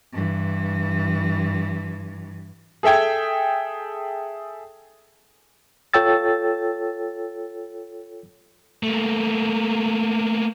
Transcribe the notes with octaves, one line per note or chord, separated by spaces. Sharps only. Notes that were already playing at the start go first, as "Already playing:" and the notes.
G2 E3
G#4 A4 E5 G5 G#6
F4 A4 C#5 G5 E6 A6
A3 A#3